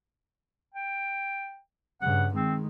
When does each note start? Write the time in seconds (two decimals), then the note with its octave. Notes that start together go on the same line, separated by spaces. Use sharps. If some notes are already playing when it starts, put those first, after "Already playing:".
0.75 G5
2.02 G2 C#3 F#5
2.34 D#3 G#3 C4